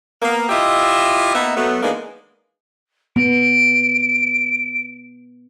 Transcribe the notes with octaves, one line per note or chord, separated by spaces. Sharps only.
A#3 B3
E4 F4 G4 D#5 E5
A#3 B3 D#4 E5
F#3 A3 B3
E3 G#3 A#3 B3 D4 D#4
B3 D7